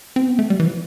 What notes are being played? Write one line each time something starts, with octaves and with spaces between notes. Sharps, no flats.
C4
B3
A3
G3
E3
F3